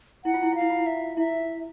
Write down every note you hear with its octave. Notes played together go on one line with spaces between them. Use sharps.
E4 F#5
F4
E4
F4 F5
E4
F4
E4
E5
E4 E5